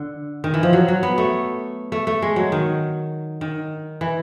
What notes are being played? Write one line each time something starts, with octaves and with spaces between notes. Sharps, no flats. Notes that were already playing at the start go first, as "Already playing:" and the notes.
Already playing: D3
D#3
E3
F3
F#3
F#3
B3
A3
A3
A3
G#3
F#3
D#3
D#3
E3